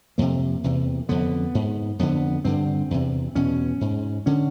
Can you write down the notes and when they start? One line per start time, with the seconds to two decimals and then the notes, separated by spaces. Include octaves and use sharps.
0.18 F2 C3 A#3
0.64 E2 C3
1.09 F2 D3 B3
1.55 G#2
1.99 F2 D3 B3
2.45 G2 D3 C4
2.91 E2 C3
3.35 E2 B2 C#4
3.81 G#2
4.26 D3 C#4